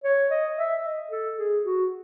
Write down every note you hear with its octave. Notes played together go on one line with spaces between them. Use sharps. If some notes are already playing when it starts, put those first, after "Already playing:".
C#5
D#5
E5
D#5
A4
G#4
F#4